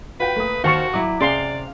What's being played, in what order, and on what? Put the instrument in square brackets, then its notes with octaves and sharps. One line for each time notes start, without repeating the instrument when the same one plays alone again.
[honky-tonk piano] F4 F#4 G5 [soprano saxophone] B4
[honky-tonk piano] A3 A#3 D#6
[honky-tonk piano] D#2 D#3 F7 [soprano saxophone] F#4 [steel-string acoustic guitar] C5 [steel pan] F5 A5 C#6
[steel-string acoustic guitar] F#3 E4 [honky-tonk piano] D6
[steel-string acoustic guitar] C3 F5 [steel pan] C#4 G#4 C6 [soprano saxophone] D5